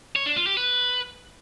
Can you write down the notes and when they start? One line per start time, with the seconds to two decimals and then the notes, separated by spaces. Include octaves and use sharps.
0.16 C#5
0.26 D4
0.36 F4
0.47 G4
0.57 B4